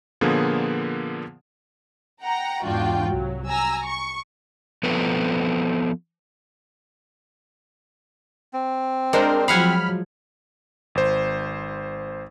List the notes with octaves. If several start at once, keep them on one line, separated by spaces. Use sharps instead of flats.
A#2 D3 F3 A#3 B3 G#4
F#5 G5 A#5
E2 G#2 D4 F4 F#4 G5
C2 F#3
G#5 A#5 E6
C#6
F3 B3 C4 A4 B4
C4
G#3 D4 A#4 C5
F3 F#3 F5 F#5 G#5 B5 F6
G#1 C5